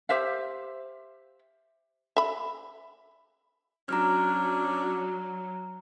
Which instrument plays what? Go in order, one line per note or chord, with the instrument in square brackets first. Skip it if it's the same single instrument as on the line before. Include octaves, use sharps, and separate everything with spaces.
[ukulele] G4 C5 E5 F5
[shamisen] E5 B5
[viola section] F#3 [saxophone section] C#4 D4 [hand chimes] A#5 F6